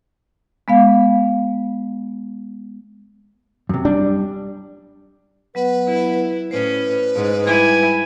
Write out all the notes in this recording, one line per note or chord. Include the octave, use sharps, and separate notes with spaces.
G#3 B3 F5
F#2 C3
G3 D4
F#3 B3 B4 F#5
E4
A2 C#4 B4 C5
G#2
G3 E4 G#5 D6